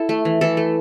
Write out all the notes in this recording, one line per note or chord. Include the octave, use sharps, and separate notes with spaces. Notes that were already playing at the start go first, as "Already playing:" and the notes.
Already playing: E4 A4
A3
E3
E3 A4
A3